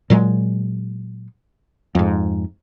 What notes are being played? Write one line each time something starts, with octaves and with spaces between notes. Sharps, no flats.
A#2 F#3 G#3
F2 G#2